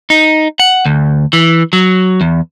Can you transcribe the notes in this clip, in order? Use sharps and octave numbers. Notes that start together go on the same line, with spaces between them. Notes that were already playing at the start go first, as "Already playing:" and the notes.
D#4
F#5
D2
E3
F#3
E2